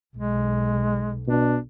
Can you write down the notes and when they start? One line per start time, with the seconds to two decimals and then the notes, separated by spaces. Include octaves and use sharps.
0.17 B1 G#3
1.28 B2 D4